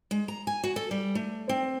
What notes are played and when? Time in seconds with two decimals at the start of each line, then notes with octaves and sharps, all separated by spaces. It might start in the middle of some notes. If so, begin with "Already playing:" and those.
0.11 G#3
0.28 A#5
0.47 G#5
0.64 F#4
0.76 A4
0.91 G3
1.15 A3
1.49 C4